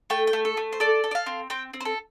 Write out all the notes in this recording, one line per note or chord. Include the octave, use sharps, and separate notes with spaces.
A3 G5
G5
A3
A4
A3
C5
A4 D5
A4
D5
F5
C4
C4 G5
C4
C5
A4